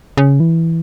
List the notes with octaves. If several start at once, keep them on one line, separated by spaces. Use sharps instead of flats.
C#3
E3